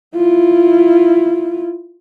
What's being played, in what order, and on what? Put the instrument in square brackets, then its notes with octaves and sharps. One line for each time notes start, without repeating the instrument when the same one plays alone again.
[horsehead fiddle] E4 F4